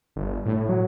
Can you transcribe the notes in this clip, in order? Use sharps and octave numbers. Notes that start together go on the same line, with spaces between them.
G1
A2
F#3